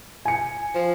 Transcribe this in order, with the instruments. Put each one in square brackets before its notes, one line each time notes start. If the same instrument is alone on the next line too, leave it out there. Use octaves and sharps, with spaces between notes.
[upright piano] G#5 C#7
[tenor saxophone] F3